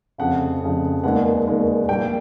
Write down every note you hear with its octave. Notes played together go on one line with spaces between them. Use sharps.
F1 F2 C#3 F#5
F1 F2 C#3
E1 D#2 D#3 G#3 B3 F#5
E1 D#2 D#3 G#3 B3
A#1 A#2 G3 G5